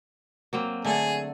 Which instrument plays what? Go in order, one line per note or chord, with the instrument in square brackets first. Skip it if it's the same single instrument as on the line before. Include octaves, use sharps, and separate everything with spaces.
[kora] F#3 A#3 C4
[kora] D3 A3 A4 [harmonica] G#4